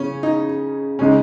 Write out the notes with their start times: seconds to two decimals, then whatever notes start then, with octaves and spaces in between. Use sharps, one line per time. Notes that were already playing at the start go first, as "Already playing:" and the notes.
Already playing: C#3 C#4
0.23 D#4
0.99 C#3 G#3 C#4 D#4